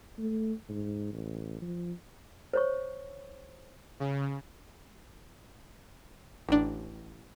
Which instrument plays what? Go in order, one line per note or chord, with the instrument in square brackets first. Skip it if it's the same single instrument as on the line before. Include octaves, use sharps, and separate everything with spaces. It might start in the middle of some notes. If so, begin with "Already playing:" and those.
[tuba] A3
G#2
A1
F3
[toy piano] C5 C#5 C#6
[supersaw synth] C#3
[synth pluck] A1 D4